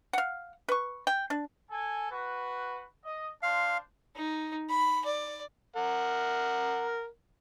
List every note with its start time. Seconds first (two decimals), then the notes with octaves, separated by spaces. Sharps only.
0.13 F5 F#5
0.69 B4 C#6
1.07 G5
1.30 D4
1.70 A4 G#5
2.10 F#4 B4
3.03 D#5
3.43 D4 C5 F5 C6
4.16 D#4
4.70 B5
5.05 D5
5.76 A#4 F#5